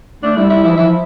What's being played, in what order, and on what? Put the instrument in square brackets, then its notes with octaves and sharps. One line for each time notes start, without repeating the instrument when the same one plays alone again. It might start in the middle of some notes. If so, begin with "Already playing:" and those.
[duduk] A3 [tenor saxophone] D4
[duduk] G3 [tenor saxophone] E4
[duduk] G3 [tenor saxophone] E4
[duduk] F3 [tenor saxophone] E4
[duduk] E3
[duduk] F3 [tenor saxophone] E4